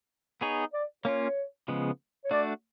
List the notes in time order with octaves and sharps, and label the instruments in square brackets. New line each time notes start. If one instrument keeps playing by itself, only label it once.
[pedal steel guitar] B3 D#4 G#4 C#5
[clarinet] D5
[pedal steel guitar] A#3 C#4 F4 [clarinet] C#5
[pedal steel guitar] C#3 F3 G#3 B3
[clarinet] C#5
[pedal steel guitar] A3 D4 F#4 [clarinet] D5